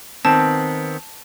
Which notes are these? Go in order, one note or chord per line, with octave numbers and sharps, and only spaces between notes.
D#3 B3 C4 A5